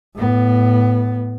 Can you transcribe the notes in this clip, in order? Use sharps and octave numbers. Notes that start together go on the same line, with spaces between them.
A2 B3